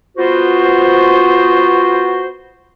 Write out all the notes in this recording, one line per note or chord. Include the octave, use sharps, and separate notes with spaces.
B3 F4 F#4 C5